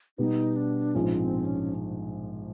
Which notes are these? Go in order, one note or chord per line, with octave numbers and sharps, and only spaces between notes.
B2 G3 B3 D#4
D4
A#1 G#2 F3 G#3 C#4
C4
C#4